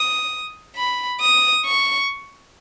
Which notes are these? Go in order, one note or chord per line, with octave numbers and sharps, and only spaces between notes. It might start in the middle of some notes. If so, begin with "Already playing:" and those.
Already playing: D#6
B5
D#6
C#6